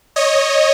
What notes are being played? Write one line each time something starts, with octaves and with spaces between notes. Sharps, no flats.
C#5 D#5